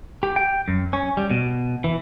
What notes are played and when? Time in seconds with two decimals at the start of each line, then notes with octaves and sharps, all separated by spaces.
0.23 G4
0.36 G5
0.68 F#2
0.93 C#4
1.17 G3
1.31 B2
1.84 E3